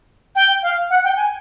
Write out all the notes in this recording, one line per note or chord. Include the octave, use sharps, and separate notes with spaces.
G5
F5
F#5
G5
G#5